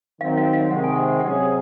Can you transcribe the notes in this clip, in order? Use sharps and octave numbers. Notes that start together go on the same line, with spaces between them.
D#3 F#3 C4 F5
F5
F5
C3 D#3 G#3 F#5
G#5
F#5
F#5
C3 F#3 C#4 G#4 F#5